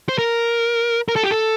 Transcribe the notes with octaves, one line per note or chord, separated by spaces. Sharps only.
C5
A#4
A#4
A4
G4
A4